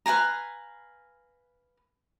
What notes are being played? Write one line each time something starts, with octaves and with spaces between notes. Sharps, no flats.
B4 F5 G#5 A#5